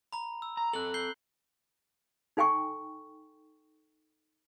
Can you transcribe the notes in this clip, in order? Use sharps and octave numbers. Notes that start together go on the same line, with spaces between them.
A#5 B5
E6
A#5
C4 A4 F#6 F#7
G6 C7 G7
D#4 A4 G5 G#5 C#6